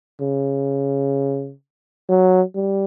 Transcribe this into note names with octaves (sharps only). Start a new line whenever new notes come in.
C#3
F#3
G3